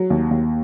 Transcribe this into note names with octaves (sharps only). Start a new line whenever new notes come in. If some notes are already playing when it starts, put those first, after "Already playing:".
Already playing: F#3
D#2
D#2